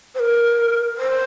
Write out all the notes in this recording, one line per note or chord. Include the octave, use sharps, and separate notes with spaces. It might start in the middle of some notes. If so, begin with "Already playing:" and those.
C5
A#4
C5